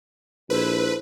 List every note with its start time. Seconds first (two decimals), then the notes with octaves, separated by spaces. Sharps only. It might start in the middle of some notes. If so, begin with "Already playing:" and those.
0.50 A#1 E4 A4 B4 C5